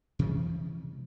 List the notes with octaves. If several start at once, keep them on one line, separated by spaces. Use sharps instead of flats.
C3 E3 F3 G#3